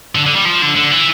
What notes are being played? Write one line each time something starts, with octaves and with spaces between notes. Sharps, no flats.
D3
D3
G3
F3
D3
D3
E3